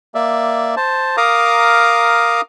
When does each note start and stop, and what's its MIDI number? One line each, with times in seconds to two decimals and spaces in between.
0.15 0.75 58
0.15 0.75 74
0.15 0.75 76
0.77 1.16 72
0.77 1.16 81
1.17 2.41 70
1.17 2.41 77
1.17 2.41 82
1.17 2.41 86
1.17 2.41 87